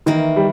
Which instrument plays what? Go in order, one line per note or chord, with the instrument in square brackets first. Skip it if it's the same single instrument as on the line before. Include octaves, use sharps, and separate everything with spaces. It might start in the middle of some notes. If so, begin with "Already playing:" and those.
[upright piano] D#3 [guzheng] E3 A#3 E4
[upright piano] G3